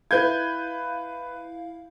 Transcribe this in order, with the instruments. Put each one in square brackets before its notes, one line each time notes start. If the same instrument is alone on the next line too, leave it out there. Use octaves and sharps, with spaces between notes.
[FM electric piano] E4 F5 [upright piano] B4 G6 G#6